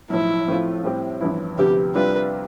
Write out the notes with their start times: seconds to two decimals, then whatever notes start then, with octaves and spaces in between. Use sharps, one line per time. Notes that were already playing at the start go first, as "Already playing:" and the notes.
0.10 B1 A2 F3 E4
0.48 A2 F3 A3 C4 F4
0.84 A2 G3 C4 G4
1.21 A1 G2 F3 B3 E4
1.58 D2 C3 F3 B3 G4
1.95 C2 C3 G3 D4 F4 B4